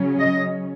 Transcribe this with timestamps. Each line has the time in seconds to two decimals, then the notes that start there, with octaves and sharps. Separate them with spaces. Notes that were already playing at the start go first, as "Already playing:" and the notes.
Already playing: C#3 F#3 C#4
0.19 D#5